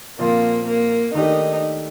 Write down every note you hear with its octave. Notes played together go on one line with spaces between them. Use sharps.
A#2 F3 A#3 C4 F4
A#3
D#3 A3 D4 D#4 G4